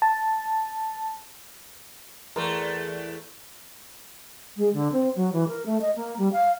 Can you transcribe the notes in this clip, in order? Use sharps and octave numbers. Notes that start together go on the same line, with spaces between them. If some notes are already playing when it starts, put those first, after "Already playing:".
A5
E2 A3 A#4 A#5 C6
G#3
D3
C4
F#3
E3
A#4
A3
D#5
A#3
G3
F5